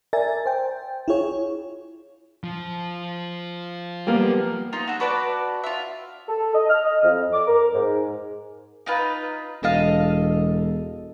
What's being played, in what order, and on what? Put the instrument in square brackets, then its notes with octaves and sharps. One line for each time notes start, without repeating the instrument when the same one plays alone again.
[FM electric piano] A#4 D5 E5 G#5 A6
C5 G5
E4 F4 G#4 C#5
[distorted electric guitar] F3
[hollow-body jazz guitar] G3 A#3 B3
[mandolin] D#4 F4 G4
F#4 A4
F#4 B4 D5 A5
F4 E5
[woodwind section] A4
D#5
F6
D#5
F2
D6
A#4
G#2
[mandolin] D#4 F4 B4
[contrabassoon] E1 [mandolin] A4 D#5 F5